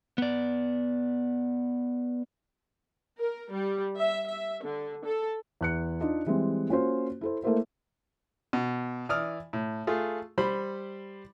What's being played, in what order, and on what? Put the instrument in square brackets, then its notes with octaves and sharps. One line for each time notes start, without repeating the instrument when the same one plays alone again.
[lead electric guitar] B3 D5
[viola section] A#4
G3
E5
E5
D3
A4
[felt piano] E2 F#6 C#7
D4 D#4 F4 D#5
E3 G3 G#3 C4
A#3 C#4 F4 F#4 C5
E4 A4 C5
A3 A#3 E4 A#4 C5 E5
[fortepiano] B2
E3 D5 D#6 F6
A2
A3 F4 G#4
G3 C5 B5